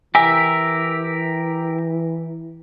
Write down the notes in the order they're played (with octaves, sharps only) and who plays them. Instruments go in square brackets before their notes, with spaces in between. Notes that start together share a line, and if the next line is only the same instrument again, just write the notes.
[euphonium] E3 [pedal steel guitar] G4 A#4 E5 [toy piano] G#5